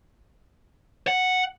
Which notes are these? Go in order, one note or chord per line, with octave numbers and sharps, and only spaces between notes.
F#5